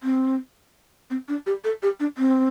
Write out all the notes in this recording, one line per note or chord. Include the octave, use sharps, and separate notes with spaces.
C4
C4
D4
G4
A4
G4
D4
C4